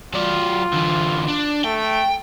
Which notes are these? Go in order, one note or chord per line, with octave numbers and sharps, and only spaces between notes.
F#3 F4 D5
D3 E3
D4
A3 G5